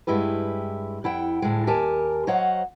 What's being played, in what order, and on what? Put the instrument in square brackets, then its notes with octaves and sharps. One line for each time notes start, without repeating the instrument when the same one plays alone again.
[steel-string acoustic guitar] G2 G#3 E4 G4 B4
F2 E4 F#5 G5
D2 A2 G#3
D#2 G4 A#4 G#5 A5
F#3 C5 C#5 D#5 F5 F#5